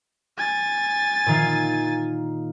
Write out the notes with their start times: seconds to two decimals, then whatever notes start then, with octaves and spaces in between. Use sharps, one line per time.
0.38 G#5 A6
1.26 A#2 D#3 F5